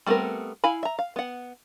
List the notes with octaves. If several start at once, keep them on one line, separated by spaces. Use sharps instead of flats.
G3 A3 B3 C4 A#4
E4 F5 G#5 B5
E5 A#5
F5
B3 F#5